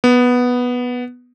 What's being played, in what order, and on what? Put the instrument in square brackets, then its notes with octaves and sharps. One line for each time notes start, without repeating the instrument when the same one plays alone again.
[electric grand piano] B3